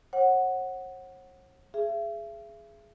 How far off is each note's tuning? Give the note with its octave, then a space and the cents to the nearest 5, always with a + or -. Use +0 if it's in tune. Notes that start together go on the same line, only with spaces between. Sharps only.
C#5 -45 F#5 +0
G#4 +5 E5 +40